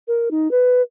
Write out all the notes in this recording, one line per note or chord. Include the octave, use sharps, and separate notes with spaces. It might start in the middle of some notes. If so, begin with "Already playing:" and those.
A#4
D#4
B4